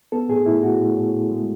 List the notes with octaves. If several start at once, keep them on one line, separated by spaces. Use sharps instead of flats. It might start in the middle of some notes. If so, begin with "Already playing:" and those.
B3 A4
A2 G#4
A2 E4
A2 F#4
A2
A2
A2
G#3